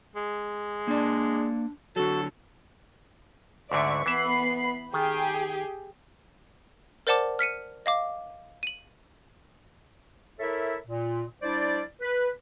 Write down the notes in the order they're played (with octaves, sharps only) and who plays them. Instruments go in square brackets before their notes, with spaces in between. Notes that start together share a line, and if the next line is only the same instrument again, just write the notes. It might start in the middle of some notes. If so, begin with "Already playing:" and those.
[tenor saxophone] G#3
[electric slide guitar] A#3 D5 [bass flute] D4
[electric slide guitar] D3 F#3 [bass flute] F#4 [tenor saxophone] A4
[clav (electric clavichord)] D2 G#2 D3 [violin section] D5 E5 C#6
[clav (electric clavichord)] E3 E5 [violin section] B3 B5 C7
[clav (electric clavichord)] D#3 [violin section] G4 G#4 G5
[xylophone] A#4 C5 D5 F#5 A5 D6
F6 B6 C#7 D#7
D#5 F5 D6
D#7 F#7
[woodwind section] E4 A4 A#4 C#5 E5
A#2
G3 D4 E4 C5 D5
B4